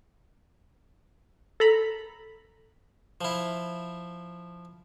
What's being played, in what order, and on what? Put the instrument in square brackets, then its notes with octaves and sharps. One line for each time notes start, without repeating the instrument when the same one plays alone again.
[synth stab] A4 A#5 B5
[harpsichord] F3 E4